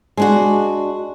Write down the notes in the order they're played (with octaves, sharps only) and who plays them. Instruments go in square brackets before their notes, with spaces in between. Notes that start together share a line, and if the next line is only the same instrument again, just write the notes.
[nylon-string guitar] G#3 D4 F#4